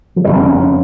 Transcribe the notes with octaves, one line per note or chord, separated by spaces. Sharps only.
F3
F1 D#2 C#3 G3
C4
C#4
C#4